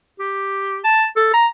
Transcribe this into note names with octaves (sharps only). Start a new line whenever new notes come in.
G4
A5
A4
A#5